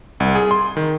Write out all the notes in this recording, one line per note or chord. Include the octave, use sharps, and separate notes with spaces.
C2
G#4
C6
D#3